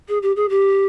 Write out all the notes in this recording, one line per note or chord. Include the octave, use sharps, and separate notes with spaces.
G#4
G4
G#4
G4